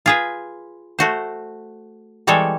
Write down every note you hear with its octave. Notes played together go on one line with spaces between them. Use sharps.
F4 G#4 B4
A3 F#4 C5
E3 G3 G#3 C4 A4 C#5